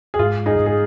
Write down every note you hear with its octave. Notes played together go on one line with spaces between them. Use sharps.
G#4
G#2 F4
D#4 G#4
G#2
G#4